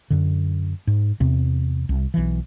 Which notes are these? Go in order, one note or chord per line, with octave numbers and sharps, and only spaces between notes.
F#2 D3
G#2
E2 C3 C4
C2
B1 E3